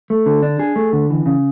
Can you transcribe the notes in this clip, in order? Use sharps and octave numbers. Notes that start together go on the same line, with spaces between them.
A3
D3
D4
G#4
A3
D3
E3
C#3